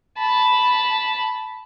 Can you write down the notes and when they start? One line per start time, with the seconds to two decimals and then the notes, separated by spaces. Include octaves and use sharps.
0.18 A5 B5